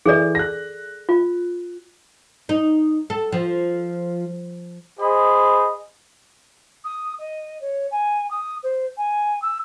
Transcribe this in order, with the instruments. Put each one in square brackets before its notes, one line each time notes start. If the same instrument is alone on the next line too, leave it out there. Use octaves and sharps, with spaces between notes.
[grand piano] E3 [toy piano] G#4 A4 D5
[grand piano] F#6 A#6
[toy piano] F4
[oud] D#4
A4
F3
[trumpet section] G#4 C5 D#5 B5
[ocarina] D#6
D#5
C#5
G#5
D#6
C5
G#5
E6